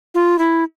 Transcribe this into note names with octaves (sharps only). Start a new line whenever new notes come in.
F4
E4